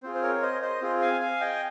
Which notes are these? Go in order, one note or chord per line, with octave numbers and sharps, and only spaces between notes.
C4 F4 G#4 C5
C5
A#4 C#5
C5 D#5
C5 D#5
C4 F4 G#4
F5 G#5
F5 G#5
D#5 G5